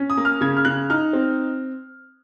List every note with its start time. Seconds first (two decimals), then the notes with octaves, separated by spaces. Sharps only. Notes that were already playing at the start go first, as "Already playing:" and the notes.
Already playing: C#4
0.10 D#6
0.17 A#3
0.25 F6
0.41 C#3 G#6
0.57 F6
0.65 C#3 F#6
0.90 D#4 F6
1.13 C4